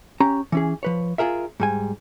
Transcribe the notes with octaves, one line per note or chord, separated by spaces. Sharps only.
C#4 G4 A#5
E3 C#4 G#4
F3 B4 C#5
F4 F#4 G#4 A#4 E5
G#2 G3 G#5